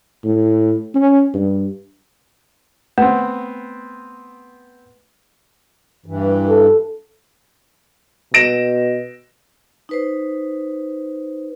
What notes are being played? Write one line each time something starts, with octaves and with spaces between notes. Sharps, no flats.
A2
C#4
G2
A3 B3 C4
G2 E3
A4
B2 A#6 D7 E7
D#4 B4 C5